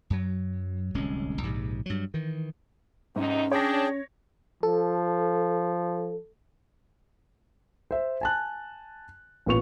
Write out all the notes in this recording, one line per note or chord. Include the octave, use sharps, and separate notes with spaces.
F#2 F#3
D1 C2 G#3 C#4
A#1 G#2 C3
G2 F#3
D#3 E3
E2 G#2 C3 C#4 D#4
D4 G#4 C#5 G5 A#6
F3 A4
C5 E5
G#5 A5 F#6
A1 A#2 B3 C#6 F7